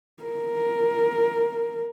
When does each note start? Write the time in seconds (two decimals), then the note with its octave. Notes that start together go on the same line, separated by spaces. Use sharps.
0.23 A#4